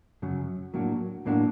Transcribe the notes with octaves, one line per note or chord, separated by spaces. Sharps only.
F#2 C#3 F#3
A2 F#3 A#3 D4 F#4
A2 F#3 A#3 D4 F#4